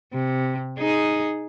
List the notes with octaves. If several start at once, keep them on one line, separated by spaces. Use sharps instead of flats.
C3
D#4 G#4